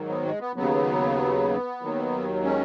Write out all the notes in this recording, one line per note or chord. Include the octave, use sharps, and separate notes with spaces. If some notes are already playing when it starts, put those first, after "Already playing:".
Already playing: G#2 D#3 F#3
B3
G#3
B3
D#2 C#3 F#3 B3
D#2 D#3 F#3
G#3 C#4